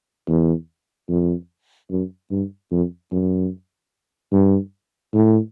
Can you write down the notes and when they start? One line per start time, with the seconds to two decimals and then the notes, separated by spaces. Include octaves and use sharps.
0.28 E2
1.09 F2
1.90 F#2
2.31 G2
2.71 F2
3.12 F#2
4.33 G2
5.14 A2